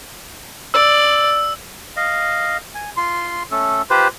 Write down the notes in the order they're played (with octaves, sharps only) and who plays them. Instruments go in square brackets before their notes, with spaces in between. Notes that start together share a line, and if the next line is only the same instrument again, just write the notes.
[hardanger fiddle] D5 [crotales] E6
[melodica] D#5 F5
G#5
F4 C6
A3 C#4 A4
F4 G4 B4 C5